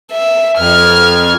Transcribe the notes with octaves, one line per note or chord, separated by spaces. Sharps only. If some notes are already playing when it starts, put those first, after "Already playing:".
E5
F2 F6 G#6